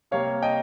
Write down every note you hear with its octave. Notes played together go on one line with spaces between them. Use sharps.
C3 G3 A#3 C#5 F5
D#5 G5